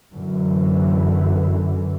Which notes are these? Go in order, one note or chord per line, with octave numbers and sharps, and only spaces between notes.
F#2 D3 E3